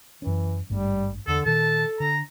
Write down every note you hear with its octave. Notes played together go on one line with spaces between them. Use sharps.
F#2 E3 C#4
G#1 G2 G3 A3
E2 D3 A4
A#2 D#3 A4 A5
D3 A#5